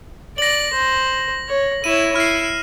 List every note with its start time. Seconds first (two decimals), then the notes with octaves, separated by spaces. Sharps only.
0.38 D5 A#6 F#7
0.73 C5
1.48 C#5
1.84 E4 C#5 D#7 E7
2.16 E4 F6 C7